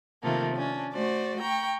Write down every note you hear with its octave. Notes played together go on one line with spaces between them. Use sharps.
C3 D#3 F3 A3 A#3
C#4 D4
A3 F#4 C5 D5
G5 A#5 C#6